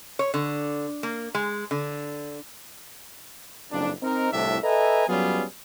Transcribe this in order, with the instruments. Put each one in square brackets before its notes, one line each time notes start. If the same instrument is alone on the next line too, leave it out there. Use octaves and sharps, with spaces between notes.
[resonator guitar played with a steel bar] C#5
D3
A#3
G#3
D3
[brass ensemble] F#1 B1 F2 D4
C4 D#4 A#4
C2 F2 A2 C3 D4 E5
A4 B4 D#5 E5 G#5 A#5
F#3 G3 B3 C#4 F4 G#4